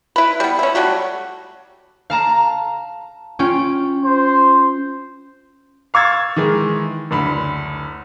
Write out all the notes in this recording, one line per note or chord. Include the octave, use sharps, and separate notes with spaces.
E4 B4
G3 B3
C#4 E4
F#3 G3 A3 F#4
F5 A5 A#5
C#4 F4 G5
C5
F5 C#6 E6 G#6 A6
D#3 E3 G#3
F#1 D2 B5